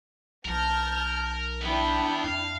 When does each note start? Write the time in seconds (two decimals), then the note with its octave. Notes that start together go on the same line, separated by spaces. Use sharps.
0.45 B1 A#4 A5 F6 G6
1.61 E3 B3 D4 E4 G5
2.24 F2 F5